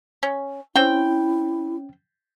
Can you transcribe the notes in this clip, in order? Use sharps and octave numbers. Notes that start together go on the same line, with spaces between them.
C#4
C4 C#4 E4 G5